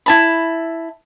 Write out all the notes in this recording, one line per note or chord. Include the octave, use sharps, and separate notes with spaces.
E4 A5 B5